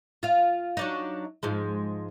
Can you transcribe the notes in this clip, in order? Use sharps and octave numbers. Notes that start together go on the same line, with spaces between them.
F4 F5
F#3 D4 D#4
G#2 F3 G#3